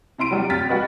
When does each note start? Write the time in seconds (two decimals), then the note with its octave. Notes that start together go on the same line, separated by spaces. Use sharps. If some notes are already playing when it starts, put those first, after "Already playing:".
0.18 C3 E4 C6 D7 D#7
0.31 F#3 G3
0.50 D2 C3 G5 F6 A6 B6
0.69 G3 F#4 B4 D#5